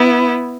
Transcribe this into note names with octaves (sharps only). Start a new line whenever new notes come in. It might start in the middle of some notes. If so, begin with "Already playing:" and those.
Already playing: B3 E4